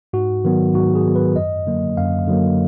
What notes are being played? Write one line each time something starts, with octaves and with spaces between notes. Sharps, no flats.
G#2 F#4
D#3 F#3 B3
G#2 F#4
G#4
D#3 F#3 B3
B4
F#2 D#5
D3 F#3 A#3
F#2 F5
D3 F#3 A#3